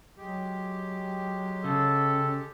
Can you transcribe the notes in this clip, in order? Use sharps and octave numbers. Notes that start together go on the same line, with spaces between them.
F#3 G#3 G4
C#3 A4